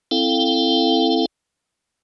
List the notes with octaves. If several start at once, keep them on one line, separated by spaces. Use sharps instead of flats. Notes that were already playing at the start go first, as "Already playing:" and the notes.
C4 E4 A4 F5 G5